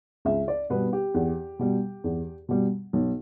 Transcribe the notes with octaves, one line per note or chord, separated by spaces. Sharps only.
C#2 E5
D5
B2 G3 B3 B4
G4
E2
B2 G3
E2
B2 G3
B1